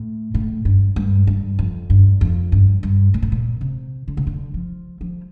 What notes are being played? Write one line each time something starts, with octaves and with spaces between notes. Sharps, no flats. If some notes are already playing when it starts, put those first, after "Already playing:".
Already playing: A2
A2
G2
G2
G2
F2
G2
F2
G2
G2
A#2
A2
A#2
C3
D3
C3
D3
F3
F3